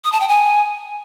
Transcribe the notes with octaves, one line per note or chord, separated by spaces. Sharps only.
D#6
A5
G5
G#5